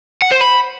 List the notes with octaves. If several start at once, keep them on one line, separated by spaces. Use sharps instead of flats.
F#5
C5
B5